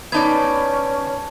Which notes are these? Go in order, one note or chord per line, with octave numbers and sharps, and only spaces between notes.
B3 C#4 D#4 D5 A5 G#6